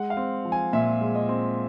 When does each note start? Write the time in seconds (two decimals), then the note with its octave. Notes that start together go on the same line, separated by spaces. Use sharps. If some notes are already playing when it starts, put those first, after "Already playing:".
Already playing: G#3 F#5
0.10 F5
0.17 C4
0.45 F3
0.52 G#5
0.73 A#2 E5
1.01 G#3
1.15 D#5
1.29 C4